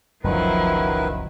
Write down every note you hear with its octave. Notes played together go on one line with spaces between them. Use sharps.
F#1 C#2 F#2 D#3 F3 F#3 E4 B4